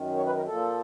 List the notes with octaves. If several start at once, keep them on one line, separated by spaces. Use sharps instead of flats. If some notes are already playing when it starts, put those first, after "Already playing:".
Already playing: F#2 D#3
C#5
B4
A#4
A#2 F3 A4